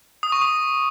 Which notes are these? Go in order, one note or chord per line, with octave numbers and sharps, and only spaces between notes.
D#6
C#6
D#6